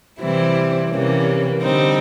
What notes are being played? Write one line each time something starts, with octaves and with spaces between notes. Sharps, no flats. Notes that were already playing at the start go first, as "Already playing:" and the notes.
C3 E3 G3 C4 E4
C3 E3 G3 A#3 C#4
D3 G3 C4 D#4